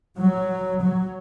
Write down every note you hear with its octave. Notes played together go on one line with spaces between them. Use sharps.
F#3
F#3